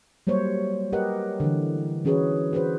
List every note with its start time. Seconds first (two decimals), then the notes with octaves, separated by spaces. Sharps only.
0.27 F#3 G3 A#3 C5 C#5
0.93 G4 A#4 B4 D#5 F#5
1.40 D3 E3
2.05 E3 C#4 F#4 G#4 B4 C#5
2.53 F#4 G#4 B4 C5